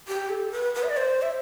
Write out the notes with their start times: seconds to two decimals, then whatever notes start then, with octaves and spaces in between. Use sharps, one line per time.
0.08 G4
0.30 A4
0.52 B4
0.75 B4
0.83 E5
0.90 D5
0.97 C5
1.22 E5